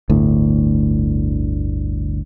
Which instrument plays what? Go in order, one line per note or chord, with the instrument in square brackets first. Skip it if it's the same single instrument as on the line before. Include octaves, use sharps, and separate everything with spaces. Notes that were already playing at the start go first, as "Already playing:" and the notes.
[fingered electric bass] G1 D2 A2